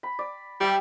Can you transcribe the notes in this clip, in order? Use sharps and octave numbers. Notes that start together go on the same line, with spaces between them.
B5
D5
G3 G4 E5 G5